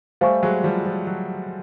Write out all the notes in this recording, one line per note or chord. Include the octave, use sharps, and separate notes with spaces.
G3 A3 C5 F5 G#5 C#6
F#3 G#3
F3 G3
F3
F#3